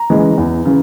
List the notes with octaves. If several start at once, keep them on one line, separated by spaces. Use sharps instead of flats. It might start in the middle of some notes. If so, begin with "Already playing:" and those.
Already playing: A#5
C#3 E3 G#3
E2
C#3 E3